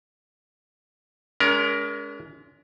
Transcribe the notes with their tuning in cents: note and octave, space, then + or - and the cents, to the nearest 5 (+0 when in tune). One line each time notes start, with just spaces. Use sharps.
G#3 +10 C#4 +45 A#4 +15